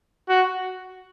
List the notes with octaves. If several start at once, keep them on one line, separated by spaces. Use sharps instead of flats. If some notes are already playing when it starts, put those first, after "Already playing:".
F#4